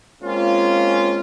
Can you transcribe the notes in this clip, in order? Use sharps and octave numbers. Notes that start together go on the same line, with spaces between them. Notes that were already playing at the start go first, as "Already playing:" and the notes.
G#3 A#3 C4 C#4 F4